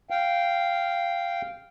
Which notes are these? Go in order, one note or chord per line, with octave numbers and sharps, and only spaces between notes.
F5 G5